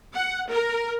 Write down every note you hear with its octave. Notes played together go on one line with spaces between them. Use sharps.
F#5
A#4